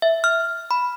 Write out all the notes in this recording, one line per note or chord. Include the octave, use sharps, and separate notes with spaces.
E5
F6
B5